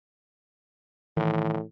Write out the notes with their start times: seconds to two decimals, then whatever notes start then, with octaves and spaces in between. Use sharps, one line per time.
1.17 A2 D#3 E3